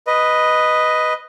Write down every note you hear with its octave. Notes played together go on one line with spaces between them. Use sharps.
B4 D#5